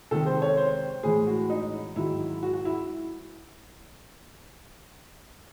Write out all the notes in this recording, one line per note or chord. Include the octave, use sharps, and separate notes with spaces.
C3 D#3 G#3 A4
C5
C#5
C5
A2 E3 G#3 G#4
F#4
D#4
G#2 D#3 F#3 E4
F#4
F#4
E4